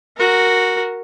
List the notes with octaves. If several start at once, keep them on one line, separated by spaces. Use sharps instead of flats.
F#4 A#4